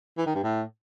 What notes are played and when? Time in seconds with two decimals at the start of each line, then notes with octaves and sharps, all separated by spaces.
0.18 E3
0.26 D#3
0.35 G2
0.44 A2